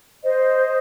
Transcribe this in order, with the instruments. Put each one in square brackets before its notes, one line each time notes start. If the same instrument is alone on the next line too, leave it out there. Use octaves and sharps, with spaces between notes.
[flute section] C5 D#5